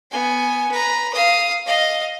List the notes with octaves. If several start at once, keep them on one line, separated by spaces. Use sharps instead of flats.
B3 G#5
B4 A#5
F5 D#6
D#5 F5